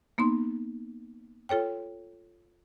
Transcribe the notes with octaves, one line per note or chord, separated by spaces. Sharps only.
A#3 B3 D#4 C6
F4 A4 C#5 G5